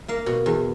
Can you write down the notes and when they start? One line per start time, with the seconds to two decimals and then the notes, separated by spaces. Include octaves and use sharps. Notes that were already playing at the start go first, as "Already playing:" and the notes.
0.08 A#3 F5
0.26 B2
0.46 E2